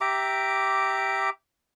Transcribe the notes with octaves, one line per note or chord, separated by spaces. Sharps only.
G4 E5 A#5 D6